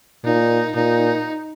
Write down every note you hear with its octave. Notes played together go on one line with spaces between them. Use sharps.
A#2 D#4
A#2 D#4